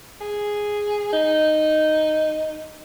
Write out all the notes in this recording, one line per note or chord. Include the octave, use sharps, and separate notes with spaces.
G#4
D#4